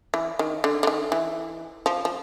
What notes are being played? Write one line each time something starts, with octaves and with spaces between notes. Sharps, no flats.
E3
D#3
D3
D3
D#3
E3
F3
F3